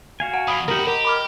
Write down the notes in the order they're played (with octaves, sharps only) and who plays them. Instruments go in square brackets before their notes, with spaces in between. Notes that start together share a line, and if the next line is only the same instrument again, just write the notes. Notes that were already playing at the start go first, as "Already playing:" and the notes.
[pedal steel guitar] F#4 F5 G#5
[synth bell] F#5
[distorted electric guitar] F2 [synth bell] F#5 B5 [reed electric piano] D#6
[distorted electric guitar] D#2 F#4 [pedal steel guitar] G4 A#4
[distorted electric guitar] G4 [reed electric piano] A#4 [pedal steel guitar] D#5
[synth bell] B5 D6 F6